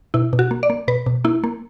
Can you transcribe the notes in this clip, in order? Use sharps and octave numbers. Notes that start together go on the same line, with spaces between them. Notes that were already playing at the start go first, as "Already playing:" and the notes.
B2 E4
B2
F#4
A#3
D5
A#3
B2 B4
B2
A#3 E4
A#3